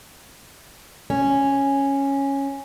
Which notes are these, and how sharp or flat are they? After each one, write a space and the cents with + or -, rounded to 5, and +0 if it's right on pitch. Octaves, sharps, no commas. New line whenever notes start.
C#4 -5